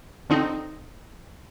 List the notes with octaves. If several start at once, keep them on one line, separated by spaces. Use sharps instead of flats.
D3 C4 D#4